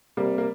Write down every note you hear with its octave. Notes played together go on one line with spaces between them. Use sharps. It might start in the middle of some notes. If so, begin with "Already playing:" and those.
C3 G3 A#3
A#3